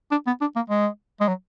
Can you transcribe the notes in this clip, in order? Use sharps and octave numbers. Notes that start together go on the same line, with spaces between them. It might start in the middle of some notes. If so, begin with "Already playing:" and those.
D4
B3
D4
A#3
G#3
G#3
F#3